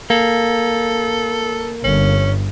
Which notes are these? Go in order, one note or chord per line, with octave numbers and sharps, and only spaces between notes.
A#3 A4
G1 C#4